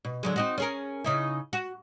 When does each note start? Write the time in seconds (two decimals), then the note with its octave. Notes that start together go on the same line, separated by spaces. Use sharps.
0.05 B2
0.23 D3 F#3 G#3
0.36 C4 D#4 F#4
0.58 C#4 G#4 A#4
1.04 C#3 D#4 E4
1.53 F#4